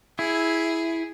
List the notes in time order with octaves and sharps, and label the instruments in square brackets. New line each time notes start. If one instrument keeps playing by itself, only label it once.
[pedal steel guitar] E4 [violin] G#4